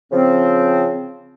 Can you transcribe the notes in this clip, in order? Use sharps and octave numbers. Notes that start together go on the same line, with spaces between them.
C#3 F3 C4